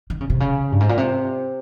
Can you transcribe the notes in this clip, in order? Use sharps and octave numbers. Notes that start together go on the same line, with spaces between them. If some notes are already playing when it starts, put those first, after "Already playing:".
D#3
C#3
C3
C#3
G2
G#2
A#2
C3